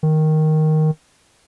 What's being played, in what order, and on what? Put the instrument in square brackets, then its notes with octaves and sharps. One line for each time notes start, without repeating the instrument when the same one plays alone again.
[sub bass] D#3